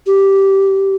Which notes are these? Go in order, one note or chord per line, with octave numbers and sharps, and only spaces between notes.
G4